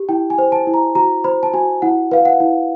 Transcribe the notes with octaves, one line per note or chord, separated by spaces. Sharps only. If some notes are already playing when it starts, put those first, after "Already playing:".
Already playing: G4
E4 G5
G#5
C5
A5
E4
A#5
F#4 A#5
C5 B5
A5
F#4 G#5
E4 F#5
B4 F5
F#5
E4